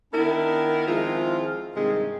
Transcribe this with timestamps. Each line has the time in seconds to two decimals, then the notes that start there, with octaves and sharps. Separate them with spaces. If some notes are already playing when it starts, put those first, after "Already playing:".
0.13 D#3 B3 D4 E4 A#4
0.86 D#3 F3 G#3 C4 E4 F4
1.75 G2 C3 D#3 G#3